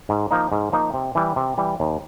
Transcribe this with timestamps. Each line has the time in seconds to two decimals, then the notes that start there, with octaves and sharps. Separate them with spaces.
0.09 G#2
0.31 F3 A#3 D#4
0.52 G#2
0.72 F3 A#3 D#4
0.94 C3
1.15 E3 G3
1.36 C3
1.58 E3 G3
1.80 D#2